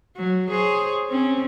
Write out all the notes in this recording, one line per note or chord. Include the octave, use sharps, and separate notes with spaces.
F#3
G#4 C5 C#5
C4 C#4